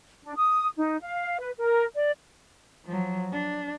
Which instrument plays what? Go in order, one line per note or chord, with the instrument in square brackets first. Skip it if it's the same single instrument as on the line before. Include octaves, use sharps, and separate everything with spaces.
[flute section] D4
D#6
D#4
F5
B4
A#4
D5
[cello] F3 F#3
D4